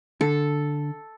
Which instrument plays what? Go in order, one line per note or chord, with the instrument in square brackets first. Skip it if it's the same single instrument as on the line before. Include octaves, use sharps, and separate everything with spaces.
[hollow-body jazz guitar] D3 [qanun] A4